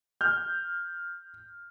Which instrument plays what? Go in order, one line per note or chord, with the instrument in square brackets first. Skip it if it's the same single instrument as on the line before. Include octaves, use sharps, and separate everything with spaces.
[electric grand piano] F6 G6